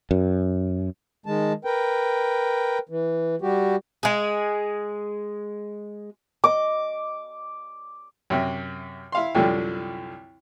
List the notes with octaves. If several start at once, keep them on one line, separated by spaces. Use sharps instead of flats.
F#2
D#3 G#3 A5
A#4 B4 G5
E3
G3 F#4 G4
G#3 G#4
D#5 D6
F#2 C3
E4 F5 C6
C2 F#2 D3 F3 G3